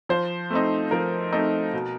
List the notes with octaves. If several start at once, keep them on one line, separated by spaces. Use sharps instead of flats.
F3 C5
A3 C4 D#4
F3 A#4
A3 C4 D#4
B2